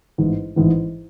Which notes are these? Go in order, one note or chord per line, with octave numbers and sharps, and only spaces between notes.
A1 G#2 E3
A1 G#2 E3